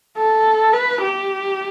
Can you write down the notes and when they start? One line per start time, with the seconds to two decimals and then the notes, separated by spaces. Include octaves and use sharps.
0.17 A4
0.73 B4
1.01 G4